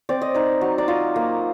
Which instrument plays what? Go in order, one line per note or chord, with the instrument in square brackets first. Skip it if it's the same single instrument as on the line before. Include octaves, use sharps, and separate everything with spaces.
[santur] C4 D5
D#5
D#4 D5
F#3
D5
F4 D#5
A#3